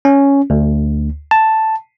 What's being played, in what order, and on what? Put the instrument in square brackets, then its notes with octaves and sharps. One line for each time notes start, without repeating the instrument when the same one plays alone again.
[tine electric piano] C#4
D2
A5